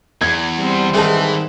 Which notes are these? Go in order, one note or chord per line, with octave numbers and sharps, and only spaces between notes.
E2 G#6
G3 C4
G#2 D#3 E3 A3 G#4 A5